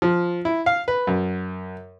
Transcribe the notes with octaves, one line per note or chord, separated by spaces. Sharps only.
F3
E4
F5
B4
F#2